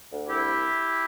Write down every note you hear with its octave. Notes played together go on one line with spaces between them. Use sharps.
D2
C2 E4 G4